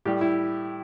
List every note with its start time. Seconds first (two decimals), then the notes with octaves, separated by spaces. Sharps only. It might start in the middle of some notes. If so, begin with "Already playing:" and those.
0.05 A2 G3 G4
0.21 E4